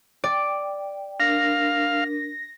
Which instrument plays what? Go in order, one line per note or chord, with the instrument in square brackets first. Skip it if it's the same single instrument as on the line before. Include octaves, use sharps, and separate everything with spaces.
[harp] D5 [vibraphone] G5
[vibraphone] D4 A#4 [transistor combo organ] F5 [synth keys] A#6